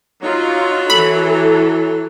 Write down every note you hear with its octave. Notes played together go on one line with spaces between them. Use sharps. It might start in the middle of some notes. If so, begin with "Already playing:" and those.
F#3 D#4 F4
E3 A4 B5